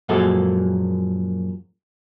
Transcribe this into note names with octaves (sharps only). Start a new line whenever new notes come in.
F#2 A#2 F3 G#3 G#4 A4